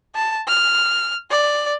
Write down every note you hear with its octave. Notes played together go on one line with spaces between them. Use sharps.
A5
F6
D5